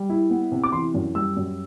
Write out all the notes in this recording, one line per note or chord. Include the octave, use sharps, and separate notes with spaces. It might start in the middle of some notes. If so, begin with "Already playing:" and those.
Already playing: G3
E4
B3
C3
D6
E3 C6
F#2
G3 E6
F#2